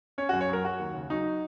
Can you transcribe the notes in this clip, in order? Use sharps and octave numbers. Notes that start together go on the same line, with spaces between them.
C#4 C#5
F#4
F#2
C#5
F#3 A#4
F#3 F#4
D#2
C#3
F#3 D#4